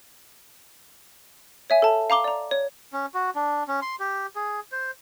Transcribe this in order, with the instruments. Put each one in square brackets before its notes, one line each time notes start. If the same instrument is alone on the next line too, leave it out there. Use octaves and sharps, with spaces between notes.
[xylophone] C#5 E5 G#5
A4 A5
F5 A#5 D6 G7
D5 A#5
C#5
[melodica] C#4
F#4
D4
C#4
C6
G4
G#4
C5